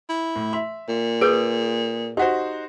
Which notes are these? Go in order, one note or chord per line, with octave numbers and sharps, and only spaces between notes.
E4
A2
E5 C6
A#2
G#4 B4 D#6 G6 D7
D#4 F#4 G4 C5 F#5